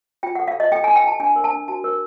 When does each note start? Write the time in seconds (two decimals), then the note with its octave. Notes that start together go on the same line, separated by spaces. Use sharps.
0.23 F4 G5
0.35 A4 F#5
0.48 F5
0.56 F4 D#5
0.72 A4 G5
0.84 E4 G#5
0.96 G5
1.04 E4 A5
1.20 D4 G#5
1.36 A#4
1.44 A5
1.52 D4
1.68 F#4 A5
1.84 A#4